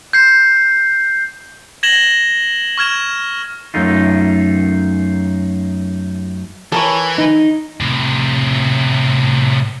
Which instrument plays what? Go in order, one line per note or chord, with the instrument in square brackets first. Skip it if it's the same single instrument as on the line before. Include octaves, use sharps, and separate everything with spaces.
[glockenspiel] G6 C7
[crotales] G#6 A#6 E7 F#7 G7
C#6 F6 G#6 E7
[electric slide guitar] F#2 A3 D#4 F4
[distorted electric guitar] E3 [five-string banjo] A4 A#4 C#5
[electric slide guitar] D#4
[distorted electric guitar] A2 C3